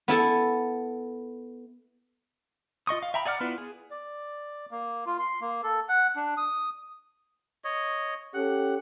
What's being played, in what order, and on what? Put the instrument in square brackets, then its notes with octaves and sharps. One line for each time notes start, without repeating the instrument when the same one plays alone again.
[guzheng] B3 E4 A4
[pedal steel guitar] F4 D#5 C#6 D#6
F5
E5 G5 A#5 B5
G#4 D5 F#5 D6 F6
B3 E4 F4 B4
G#4
[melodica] D5
A#3
F4
C6
A#3
A4
F#5
D4
D#6
C#5 D#5
[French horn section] C#4 G4 A4 [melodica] F#5